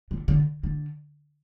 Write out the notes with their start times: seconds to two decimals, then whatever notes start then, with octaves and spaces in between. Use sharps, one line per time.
0.11 D3
0.28 D3
0.63 D3